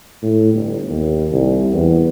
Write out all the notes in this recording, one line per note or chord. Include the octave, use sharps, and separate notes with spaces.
A2
G1
D#2
C2
E2